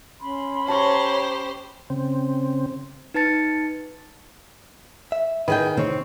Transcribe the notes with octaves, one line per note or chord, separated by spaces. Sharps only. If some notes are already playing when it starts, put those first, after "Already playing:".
C#4 B5 C6
G4 C5 C#5 A5 A#5 C#6
C#3 C4
D#4 B4 A5 A6 C#7
E5
D#3 G#4 B4 G5
C3 D#3 C4 C#5